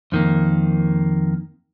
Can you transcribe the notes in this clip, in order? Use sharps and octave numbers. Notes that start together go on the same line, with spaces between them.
F2 D#3 A#3